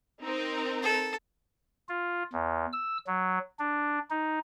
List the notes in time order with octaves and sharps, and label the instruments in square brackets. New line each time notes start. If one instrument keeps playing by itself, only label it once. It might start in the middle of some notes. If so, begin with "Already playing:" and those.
[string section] C4 D#4 A#4
[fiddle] A4
[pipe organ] F4
E2
E6
F#3
D4
D#4